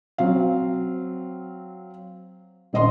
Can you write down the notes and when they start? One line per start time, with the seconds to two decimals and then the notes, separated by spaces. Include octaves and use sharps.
0.18 F#3 C4 F5
2.73 D#1 A#1 D#5 C6